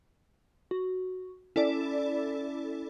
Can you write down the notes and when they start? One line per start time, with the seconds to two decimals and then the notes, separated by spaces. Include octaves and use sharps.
0.71 F#4
1.56 C#4 E4 A4 D5